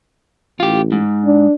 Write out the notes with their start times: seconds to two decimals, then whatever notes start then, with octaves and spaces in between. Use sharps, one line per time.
0.60 A1 F4 G4
0.92 G#2
1.25 D4